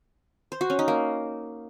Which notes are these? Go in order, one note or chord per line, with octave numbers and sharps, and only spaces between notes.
C5
F#4
C#4
D#4
A#3